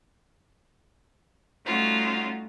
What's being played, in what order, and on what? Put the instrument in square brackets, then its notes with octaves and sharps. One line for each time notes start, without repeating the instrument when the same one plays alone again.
[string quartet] G3 A3 C#4 D#4 F4 F#4